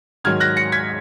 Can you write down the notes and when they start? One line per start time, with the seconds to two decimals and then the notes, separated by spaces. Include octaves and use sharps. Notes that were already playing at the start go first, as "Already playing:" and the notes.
0.24 G#2 D#3 F#3 F6 G#6
0.40 F#6 A#6
0.57 A#6 C#7
0.72 G#6 B6